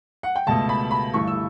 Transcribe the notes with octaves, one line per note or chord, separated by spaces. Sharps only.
F#5
G5
C#2 B2 A3 A5
B5
B5
G1 G2 E3 A3 C#6
E6